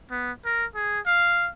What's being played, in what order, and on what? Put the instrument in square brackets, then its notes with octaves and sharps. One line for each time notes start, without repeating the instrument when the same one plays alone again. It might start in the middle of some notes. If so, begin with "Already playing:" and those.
[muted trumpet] B3
A#4
G#4
F5